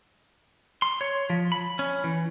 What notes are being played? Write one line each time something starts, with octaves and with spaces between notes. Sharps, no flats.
C6
C#5
F3
B5
C#4
E3